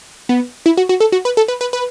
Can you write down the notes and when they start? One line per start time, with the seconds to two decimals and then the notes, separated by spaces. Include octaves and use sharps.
0.29 B3
0.66 E4
0.77 F#4
0.89 F#4
1.00 A4
1.12 F#4
1.25 B4
1.37 A4
1.48 B4
1.61 B4
1.73 B4